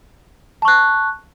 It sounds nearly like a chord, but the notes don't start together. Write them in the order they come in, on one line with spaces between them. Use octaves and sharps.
A5 C#6 F#6